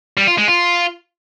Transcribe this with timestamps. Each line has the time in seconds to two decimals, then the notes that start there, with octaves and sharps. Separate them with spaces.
0.17 G3
0.28 F4
0.38 G#3
0.48 F4